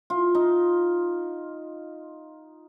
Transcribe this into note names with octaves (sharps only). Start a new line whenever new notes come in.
F4
D#4